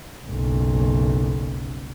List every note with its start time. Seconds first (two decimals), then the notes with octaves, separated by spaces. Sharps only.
0.25 F#1 B1